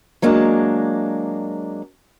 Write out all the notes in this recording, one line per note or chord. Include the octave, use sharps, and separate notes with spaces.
F#3 G#3 A#3 D4